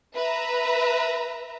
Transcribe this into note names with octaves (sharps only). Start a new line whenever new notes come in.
B4 E5 A#5